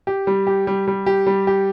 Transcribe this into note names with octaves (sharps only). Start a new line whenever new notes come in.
G4
G3
G4
G3
G3
G4
G3
G4